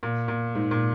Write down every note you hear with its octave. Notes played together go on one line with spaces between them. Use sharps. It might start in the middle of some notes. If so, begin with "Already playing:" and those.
A#2
A#2
G#2
A#2